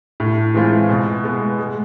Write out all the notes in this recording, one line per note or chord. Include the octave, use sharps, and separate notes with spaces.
A2
E3 G#3 C4 F4
B2
G#3 B3
G#3